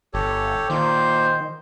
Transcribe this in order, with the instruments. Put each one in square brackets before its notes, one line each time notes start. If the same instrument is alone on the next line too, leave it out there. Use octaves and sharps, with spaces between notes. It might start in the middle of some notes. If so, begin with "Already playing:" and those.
[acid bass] G1 [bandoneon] G4 A4 C#5
[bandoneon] A#2 A#3 G6 [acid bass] D#3 [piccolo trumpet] C5